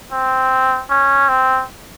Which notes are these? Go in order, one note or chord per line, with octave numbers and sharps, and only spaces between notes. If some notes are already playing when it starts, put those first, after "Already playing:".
C4
C#4
C4